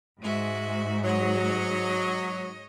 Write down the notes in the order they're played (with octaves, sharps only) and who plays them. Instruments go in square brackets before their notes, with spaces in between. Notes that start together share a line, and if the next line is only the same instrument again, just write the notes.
[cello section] G#2 [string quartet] G#3 F#4 E5
[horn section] F#3 [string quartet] C#5 D#5